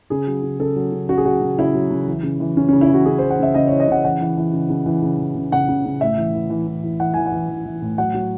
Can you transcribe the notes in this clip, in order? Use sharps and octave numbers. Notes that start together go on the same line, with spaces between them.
C#3 G#4
F#3
C#3
C#3 A4
F#3
C#3
C#3 F#4
G#4
F#3 F#4
C#3
C#3 E4
F#3
C#3
E3
C#3
E3
C#3 C#4
C#4
C#3
E4
E3 F#4
C#3 G#4
C5
E3
F#5
C#3 E5
C#3 D#5
C#5
E3
D#5
C#3 F#5
E3 F#5
E3
E3
C#3
C#3
E3
C#3
E3
C#3
C#3 F#5
C#3
C#3
A2 E5
E3
E3
E3
E3
E3
E3 F#5
E3 G#5
F#5
E3
E3
E3
A2
F#3 F#5
F#3